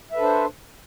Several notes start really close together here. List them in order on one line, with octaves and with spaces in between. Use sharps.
E5 B4 A4 D4 C5